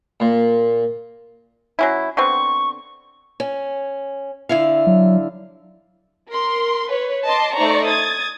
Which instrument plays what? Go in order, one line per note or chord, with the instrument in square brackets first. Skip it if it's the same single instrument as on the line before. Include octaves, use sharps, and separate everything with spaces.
[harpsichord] A#2
[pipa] F#3 C#4 E4
[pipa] D3 B3 C4 [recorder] C#6
[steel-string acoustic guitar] C#4
D3 E4 F5
[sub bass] F#3
[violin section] A#4 C6
B4 C#5
D#5 A5 C6 D6
A3 D#4 C5 D5 A#5 C#6
D#6 G#6 A6